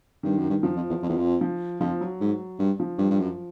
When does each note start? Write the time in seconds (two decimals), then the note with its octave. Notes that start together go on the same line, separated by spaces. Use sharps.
0.23 G2 D#3
0.37 F#2
0.50 G2
0.63 F#2 F3
0.76 F2
0.89 E2
1.02 F2
1.09 E2
1.17 F2
1.41 F3
1.80 F2 F3
2.01 F#3
2.20 G#2
2.59 G2
2.80 F3
2.98 G2
3.11 G2
3.20 F#2